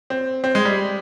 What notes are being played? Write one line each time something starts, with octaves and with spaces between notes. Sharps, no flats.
C4
C4
G#3
G3